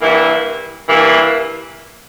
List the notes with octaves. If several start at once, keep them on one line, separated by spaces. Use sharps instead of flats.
G2 E3 A#3 E4
G2 E3 A#3 E4